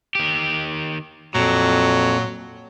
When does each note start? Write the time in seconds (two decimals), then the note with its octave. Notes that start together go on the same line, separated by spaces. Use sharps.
0.15 D#3 G4
1.35 F2 A#2 F#3